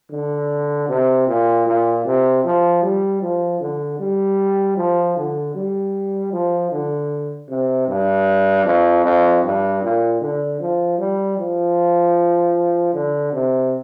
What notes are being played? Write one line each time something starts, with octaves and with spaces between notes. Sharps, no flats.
D3
C3
A#2
A#2
C3
F3
G3
F3
D3
G3
F3
D3
G3
F3
D3
C3
G2
F2
F2
G2
A#2
D3
F3
G3
F3
D3
C3